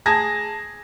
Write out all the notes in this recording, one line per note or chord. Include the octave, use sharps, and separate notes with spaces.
G#4 A5 G#6 A#6